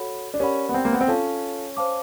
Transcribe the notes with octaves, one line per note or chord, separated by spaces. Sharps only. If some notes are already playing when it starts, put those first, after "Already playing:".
Already playing: F#4 A4 C#5 F#5 B5
D4
C#4 G4 A#4 D5 F#5 B5
B3
C4
A#3
B3
C4
C#4 F4 A4 C#5 F5 A5
C5 F5 A5 D6